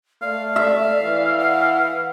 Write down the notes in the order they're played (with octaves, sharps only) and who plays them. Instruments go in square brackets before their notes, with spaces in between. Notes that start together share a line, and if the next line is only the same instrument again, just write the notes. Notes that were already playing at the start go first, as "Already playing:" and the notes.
[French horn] A3 [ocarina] D5 [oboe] F5
[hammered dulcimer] E5 [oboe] F5
[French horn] E3
[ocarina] F#5